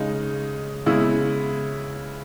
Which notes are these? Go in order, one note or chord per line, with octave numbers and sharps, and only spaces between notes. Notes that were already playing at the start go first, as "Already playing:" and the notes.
Already playing: C#3 G#3 D#4
C#3 G#3 B3 E4